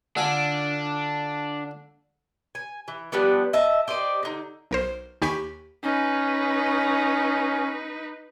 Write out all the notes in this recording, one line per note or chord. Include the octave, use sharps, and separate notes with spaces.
D3 D4 F4 G#5
G#5
E3
F3 G3 B3 D4
D#5 E5 A5
G4 C5 D5 D#5
D3 D#4
B1 A#4 C5
D#2 G4 G#5 B5 C#6 B6
C#4 D#4 B4